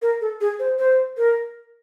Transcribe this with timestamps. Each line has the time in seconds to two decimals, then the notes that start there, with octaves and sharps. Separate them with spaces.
0.02 A#4
0.21 A4
0.41 G#4
0.59 C5
0.79 C5
1.17 A#4